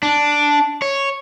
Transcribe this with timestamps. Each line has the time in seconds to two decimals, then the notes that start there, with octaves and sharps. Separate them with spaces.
0.03 D4
0.82 C#5